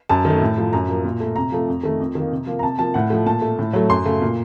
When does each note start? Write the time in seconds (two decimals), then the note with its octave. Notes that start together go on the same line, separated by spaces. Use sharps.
0.09 F#2 A5
0.25 D#3
0.30 A3
0.41 A2
0.58 F3 A3
0.73 F#2 A#5
0.88 F3 A#3
1.04 A#2
1.20 A3
1.36 C3 A#5
1.52 F3 A3
1.68 F2
1.83 D#3 A3
2.00 F2
2.15 D#3 A#3
2.32 C3
2.47 F3 A#3
2.59 A#5
2.63 C3 A5
2.79 F3 A#3 A5
2.94 A2 F#5
3.10 F3 A3
3.26 A#2 A5
3.42 A3
3.59 A2
3.73 F#3 A3
3.90 F#2 C6
4.05 C#3 A3
4.22 A#2